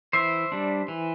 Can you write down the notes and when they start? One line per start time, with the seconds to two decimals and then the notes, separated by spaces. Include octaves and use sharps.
0.13 E3 C5 E5
0.52 G3 D4
0.88 E3